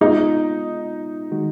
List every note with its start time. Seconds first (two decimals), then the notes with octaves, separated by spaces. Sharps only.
0.01 G#3 B3 D#4 F4
1.31 D#3 G#3 D#4 F#4